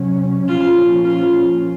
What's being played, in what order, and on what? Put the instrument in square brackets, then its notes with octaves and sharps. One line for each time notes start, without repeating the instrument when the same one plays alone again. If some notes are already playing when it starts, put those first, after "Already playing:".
Already playing: [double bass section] C3 F#3 C#4
[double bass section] A#2 F3 A#3 C#4 [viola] F4
[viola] F4